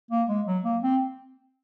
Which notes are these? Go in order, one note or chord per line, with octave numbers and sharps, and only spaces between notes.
A#3
G#3
F#3
A#3
C4